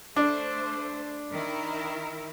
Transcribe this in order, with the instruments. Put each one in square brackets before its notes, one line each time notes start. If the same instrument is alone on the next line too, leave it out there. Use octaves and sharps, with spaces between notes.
[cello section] A3 C5 [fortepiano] D4
[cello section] D#3 E4 A#4